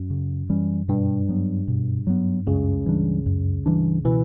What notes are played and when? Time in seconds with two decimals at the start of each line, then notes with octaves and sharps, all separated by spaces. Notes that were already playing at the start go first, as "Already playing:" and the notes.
Already playing: F#2
0.10 C#3
0.50 E3 G3 C#4
0.88 G2 B2
1.29 F#3 B3
1.68 B2
2.07 F#3 B3
2.47 C#2 F#2 C#3
2.86 E3 G3 D4
3.26 F#2
3.66 E3 G3 D4
4.04 B2 E3